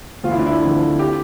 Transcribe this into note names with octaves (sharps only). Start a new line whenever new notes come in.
D2 F4
E4
D4
E4
D3 F3 C4
G4